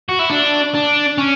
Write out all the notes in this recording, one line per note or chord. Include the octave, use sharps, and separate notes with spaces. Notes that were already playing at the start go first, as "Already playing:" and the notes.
F#4
E4
D4
D4
C#4